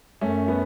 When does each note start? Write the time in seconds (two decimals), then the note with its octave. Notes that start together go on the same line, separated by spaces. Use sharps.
0.21 F#2 A3 C#4
0.48 B3